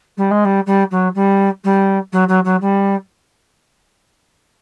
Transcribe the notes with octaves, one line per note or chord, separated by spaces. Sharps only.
G3
G#3
G3
G3
F#3
G3
G3
F#3
F#3
F#3
G3